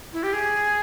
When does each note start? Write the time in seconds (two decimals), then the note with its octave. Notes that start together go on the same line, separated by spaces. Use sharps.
0.13 E4
0.23 G4
0.33 G#4